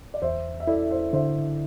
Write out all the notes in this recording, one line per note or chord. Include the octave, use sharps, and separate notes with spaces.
D5
E2 C5 E5
E5
E4 A4 D5
C5 E5
D3 C5 E5